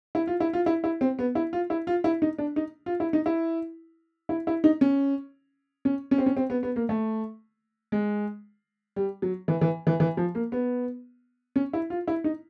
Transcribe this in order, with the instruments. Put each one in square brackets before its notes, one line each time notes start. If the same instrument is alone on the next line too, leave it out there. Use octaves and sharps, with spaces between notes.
[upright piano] E4
F4
E4
F4
E4
E4
C4
B3
E4
F4
E4
F4
E4
D#4
D4
D#4
F4
E4
D#4
E4
E4
E4
D#4
C#4
C#4
C#4
C4
C#4
C4
B3
B3
A#3
A3
G#3
G3
F#3
E3
E3
E3
E3
F3
A#3
B3
C#4
E4
F4
E4
D#4